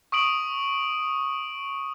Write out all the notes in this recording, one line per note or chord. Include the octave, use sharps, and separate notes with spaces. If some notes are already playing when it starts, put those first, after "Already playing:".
C#6 D#6 D7 F#7